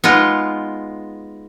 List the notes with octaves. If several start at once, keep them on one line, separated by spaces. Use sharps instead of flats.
G#3 B3 D#4 F4